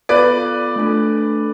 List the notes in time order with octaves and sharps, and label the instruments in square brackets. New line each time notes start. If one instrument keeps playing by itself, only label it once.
[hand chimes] B3 F4 A4 [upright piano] B4 D5
[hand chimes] A3 D4 A4